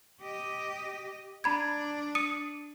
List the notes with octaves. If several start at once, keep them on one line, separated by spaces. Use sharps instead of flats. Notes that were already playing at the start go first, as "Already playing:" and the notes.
G4 D#5
D4 A#5 B5 G#6
D#6 C#7 D#7